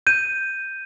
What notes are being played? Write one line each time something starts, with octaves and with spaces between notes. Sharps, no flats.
G6 D#7